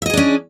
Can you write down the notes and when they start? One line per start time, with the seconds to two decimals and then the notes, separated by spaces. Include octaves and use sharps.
0.02 E5
0.06 D#5
0.10 G#4
0.14 D4
0.17 C#4